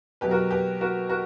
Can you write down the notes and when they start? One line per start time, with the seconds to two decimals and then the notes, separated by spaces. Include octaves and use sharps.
0.21 B2 F#3 G4 B4
0.31 F#4 A#4
0.51 G4 B4
0.81 F#4 A#4
1.09 F#4 A#4